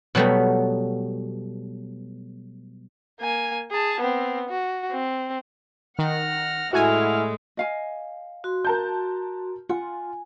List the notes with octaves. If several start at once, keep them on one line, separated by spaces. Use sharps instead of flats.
B2 F#3 G3 A3 B3
A#3 G#5
G#4 A5
B3 C4
F#4
C4
D#3 F#5 F6 A#6
A2 G#3 A3 E4 F#4 G#5 F6
D#5 F5 G#5
F#4 C6
A#4 A5 G6
F4 F#5 G#5